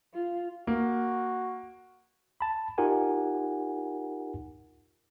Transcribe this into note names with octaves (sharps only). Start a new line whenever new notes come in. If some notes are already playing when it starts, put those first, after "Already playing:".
F4
A#3 F#4
A5 B5
D#4 F4 G4 A#4 F#5 G#5